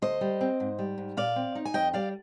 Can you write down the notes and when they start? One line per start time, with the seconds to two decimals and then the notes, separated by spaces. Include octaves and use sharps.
0.02 D2 C5 D#5
0.21 G3
0.41 C4
0.60 G#2
0.79 G3
0.98 G#2
1.17 A#2 D5 F5
1.36 C4
1.55 D#4
1.65 G#5
1.74 F2 D#5 G5
1.93 G3 D5 F5